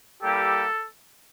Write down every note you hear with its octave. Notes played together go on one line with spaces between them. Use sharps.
G3 A#3 E4 G4 A4